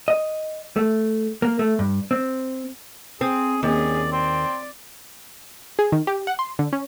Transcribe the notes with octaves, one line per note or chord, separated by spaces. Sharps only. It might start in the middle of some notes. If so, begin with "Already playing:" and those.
D#5
A3
A#3
A3
G2
C4
C4 G#4
D#2 C#4 G#4 D5
C4 D5
G#4
D#3
G4
F#5
C6
D3
C#4